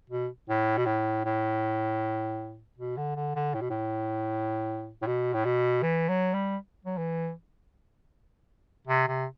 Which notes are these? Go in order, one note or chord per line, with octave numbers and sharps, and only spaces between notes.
B2
A2
B2
A2
A2
B2
D3
D3
D3
A2
B2
A2
A2
B2
A2
B2
E3
F#3
G3
F#3
E3
C3
C3